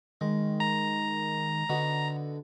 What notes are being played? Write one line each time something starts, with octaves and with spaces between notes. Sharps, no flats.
D#3 G#3
A#5
D3 B3 D#4 F#4